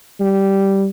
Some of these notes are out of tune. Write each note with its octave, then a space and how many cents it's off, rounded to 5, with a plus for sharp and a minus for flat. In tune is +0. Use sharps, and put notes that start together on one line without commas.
G3 -10